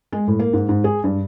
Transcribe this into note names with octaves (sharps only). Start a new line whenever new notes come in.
G#3
A2
A#3
G#2
G#2
G#4
G2